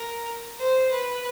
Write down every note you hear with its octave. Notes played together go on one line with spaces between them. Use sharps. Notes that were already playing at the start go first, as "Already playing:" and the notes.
Already playing: A#4
C5
B4